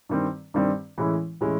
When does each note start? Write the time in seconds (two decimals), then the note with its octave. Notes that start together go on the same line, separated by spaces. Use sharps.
0.09 G2 D#3 G3 C4
0.54 G2 D#3 G3 C4
0.98 A2 E3 G#3 C#4 E4
1.41 A2 E3 G#3 C#4 E4